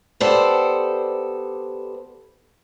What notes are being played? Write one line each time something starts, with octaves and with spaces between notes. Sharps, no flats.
B3 G4 A4 C5 D5